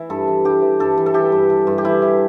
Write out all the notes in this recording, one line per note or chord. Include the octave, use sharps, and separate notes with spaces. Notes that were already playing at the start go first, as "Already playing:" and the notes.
Already playing: E3 E4
G2 A4
E3
G2 G4
E3
G2 A4
E3
A4
E3 G4
G2
E3
G2
G4
E3 E4
E3